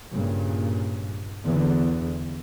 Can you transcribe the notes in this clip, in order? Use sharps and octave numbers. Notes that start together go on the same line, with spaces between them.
G2 A#2 C#3
E2 D3